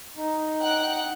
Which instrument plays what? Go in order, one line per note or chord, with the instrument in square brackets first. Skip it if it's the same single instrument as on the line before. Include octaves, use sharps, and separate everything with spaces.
[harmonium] D#4
[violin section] F#5 G5 F#6